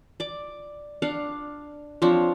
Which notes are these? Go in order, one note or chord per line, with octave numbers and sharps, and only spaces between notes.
D5 D6
D4 F5 F#5
F3 C4 D4 C#5